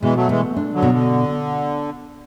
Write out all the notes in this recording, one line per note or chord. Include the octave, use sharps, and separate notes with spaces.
B2 E3 G#3
F#3 A3
E3 G#3 A3
D4
D3 F#3
B2
D3